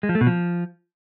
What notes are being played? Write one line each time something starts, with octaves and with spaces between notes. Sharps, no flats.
G#3
F3
A3
B2
F3